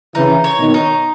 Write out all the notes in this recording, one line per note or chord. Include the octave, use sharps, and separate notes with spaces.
C#3 E3 D#4
C#5
B2 D#3
D#4